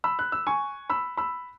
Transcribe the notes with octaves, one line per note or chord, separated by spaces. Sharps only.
B5 E6
F#6
E6
G#5 C#6
B5 E6
B5 E6